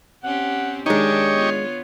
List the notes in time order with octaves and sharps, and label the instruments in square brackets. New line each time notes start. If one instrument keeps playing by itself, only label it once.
[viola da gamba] C4 C#4 G4 [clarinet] F#5
[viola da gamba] D#3 D4 [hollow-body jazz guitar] G#3 D#4 [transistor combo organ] G4 D#5 C#6 [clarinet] C#5
[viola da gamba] B3 F4